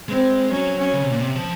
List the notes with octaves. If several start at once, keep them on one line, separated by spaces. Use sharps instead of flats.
G#3 C4
F#3 C#4
C#4
C#3
C3
A#2
C3
F3